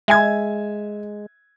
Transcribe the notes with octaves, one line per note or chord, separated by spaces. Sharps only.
G#3 E5 G#5 G#6